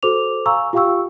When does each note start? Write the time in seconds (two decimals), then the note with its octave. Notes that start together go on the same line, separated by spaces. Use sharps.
0.03 F#4 A4 C5 D6 F7
0.46 F5 G#5 A#5 C#6 E6
0.73 F4 G4 F5 G5 C#6 E6